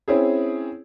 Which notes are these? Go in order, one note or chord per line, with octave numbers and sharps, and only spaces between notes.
C4 C#4 E4 G#4